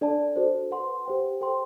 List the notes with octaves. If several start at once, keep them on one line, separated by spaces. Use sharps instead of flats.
D4 A4 D5 A5
F#4 A4 C5
B4 F#5 C6
G4 C5 G5
A4 C5 G5 C6